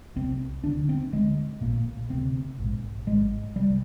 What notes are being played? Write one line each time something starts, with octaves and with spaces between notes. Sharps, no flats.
C2 C3 C4
D2 D3 D4
C4
D2 D3 G#3
A#1 A#2 A#3
D2 C3 C4
A#1 G#2
G#1 G#2 G#3
C2 C3 G3